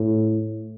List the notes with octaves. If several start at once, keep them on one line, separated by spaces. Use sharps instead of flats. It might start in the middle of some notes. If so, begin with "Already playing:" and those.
Already playing: A2